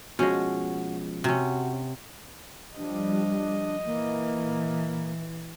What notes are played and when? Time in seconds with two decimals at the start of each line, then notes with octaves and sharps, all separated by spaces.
0.19 B2 F3 G#3 C#4 F#4
1.24 C3 C#4 F#4
2.77 F3 G3 D4 D#5
3.86 A#2 E3 A#3